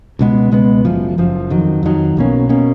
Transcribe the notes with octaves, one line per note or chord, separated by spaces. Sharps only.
C#2 B2 G#3 B3
C#2 B2 G#3 B3
F#1 F#2 F3
F#1 F#2 F3
F2 D#3 F#3
F2 D#3 F#3
B1 B2 A#3 C#4
B2 A#3 C#4